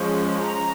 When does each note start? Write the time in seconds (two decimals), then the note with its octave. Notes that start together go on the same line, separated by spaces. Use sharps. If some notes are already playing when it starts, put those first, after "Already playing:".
Already playing: F3 G#3 C#4
0.41 A#5